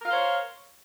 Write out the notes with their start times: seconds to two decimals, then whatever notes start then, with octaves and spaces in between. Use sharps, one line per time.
0.01 A#4
0.05 F5
0.09 C5
0.13 C#5